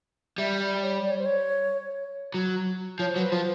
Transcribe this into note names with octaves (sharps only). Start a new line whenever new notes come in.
G3 E5
D5
C#5
D5
C#5
C5
C#5
F#3
F3 C#5
C5
F#3
B4
F3 C5